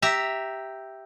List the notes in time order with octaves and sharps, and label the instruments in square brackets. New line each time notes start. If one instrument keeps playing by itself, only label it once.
[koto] G4 E5 A#5